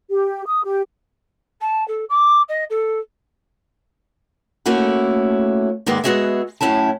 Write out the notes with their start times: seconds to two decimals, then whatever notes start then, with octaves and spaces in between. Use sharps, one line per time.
0.10 G4
0.47 D#6
0.64 G4
1.61 A5
1.88 A4
2.09 D6
2.48 D#5
2.70 A4
4.66 A3 A#3 C#4 E4 F#4
5.86 G#2 D#3 G#3 A#3 B3 D5
6.04 G#3 B3 F#4 G#4 D#5 E5
6.61 F#2 A2 C#4 E4 A5